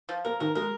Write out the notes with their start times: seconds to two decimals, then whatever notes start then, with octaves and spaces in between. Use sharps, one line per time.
0.09 F3
0.25 A#3 A#4
0.40 D#3 A#4
0.55 G#3 A#4